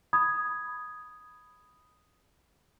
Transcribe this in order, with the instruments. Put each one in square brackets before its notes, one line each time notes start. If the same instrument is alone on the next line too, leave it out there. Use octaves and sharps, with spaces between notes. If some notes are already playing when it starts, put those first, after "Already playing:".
[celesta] B5 D#6 G#6